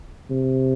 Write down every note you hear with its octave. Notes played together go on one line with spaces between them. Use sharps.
C3